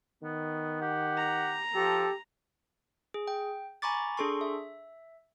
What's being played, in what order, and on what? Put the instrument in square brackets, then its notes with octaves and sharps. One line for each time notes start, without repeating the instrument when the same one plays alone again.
[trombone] D#3 [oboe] B3
[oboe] G4 [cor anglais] F#5
[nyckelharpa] A#5
[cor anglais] F3 [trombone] G4 [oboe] A4
[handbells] G#4
G5
G#5 A#5 B5 C#6 D6 A6
D4 G#4 A4 C6 C#6
E5